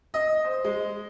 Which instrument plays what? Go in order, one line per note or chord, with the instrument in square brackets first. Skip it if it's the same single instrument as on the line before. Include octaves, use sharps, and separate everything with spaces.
[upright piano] D#5
C5
G#3